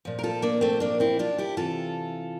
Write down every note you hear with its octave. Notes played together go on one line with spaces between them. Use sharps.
A#2 F3
A#4
F4 A4
A#3 D4
A3 C4
A#3 D4
C4 E4
D4 F4
E4 G4
C3 E3 F4 A4